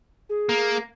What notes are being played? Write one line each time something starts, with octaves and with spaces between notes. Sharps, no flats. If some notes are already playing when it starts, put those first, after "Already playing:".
G#4
A#3